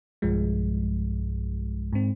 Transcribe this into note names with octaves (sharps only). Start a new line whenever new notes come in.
B1 G2 F3 G#3
G#2 C4